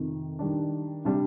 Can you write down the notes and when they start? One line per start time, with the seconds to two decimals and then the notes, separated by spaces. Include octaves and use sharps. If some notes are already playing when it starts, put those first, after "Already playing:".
Already playing: F2 C3 D#3
0.39 D#3 G3 D4
1.05 C3 G3 D4